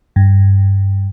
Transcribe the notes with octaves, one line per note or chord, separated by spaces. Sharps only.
G2